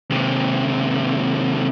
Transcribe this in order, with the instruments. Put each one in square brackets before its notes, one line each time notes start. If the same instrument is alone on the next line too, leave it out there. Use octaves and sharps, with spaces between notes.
[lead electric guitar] D#2 C3